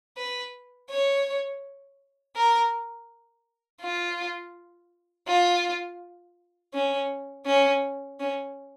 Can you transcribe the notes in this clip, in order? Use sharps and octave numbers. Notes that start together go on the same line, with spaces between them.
B4
C#5
A#4
F4
F4
C#4
C#4
C#4